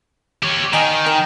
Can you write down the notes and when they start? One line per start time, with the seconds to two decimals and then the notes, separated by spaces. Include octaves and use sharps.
0.43 G4 C#5
0.73 D#3 D#5 G#5
1.06 A#4 D#5 G5